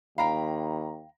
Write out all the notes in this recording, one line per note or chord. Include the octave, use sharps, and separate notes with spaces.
D#2 F5 G5 A#5 B5